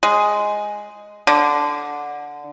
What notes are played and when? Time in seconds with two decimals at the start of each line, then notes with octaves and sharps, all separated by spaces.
0.03 G#3
1.27 D3